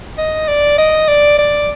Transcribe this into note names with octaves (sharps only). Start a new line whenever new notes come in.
D#5
D5
D#5
D5
D5